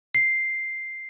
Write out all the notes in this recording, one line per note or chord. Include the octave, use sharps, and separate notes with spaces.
C7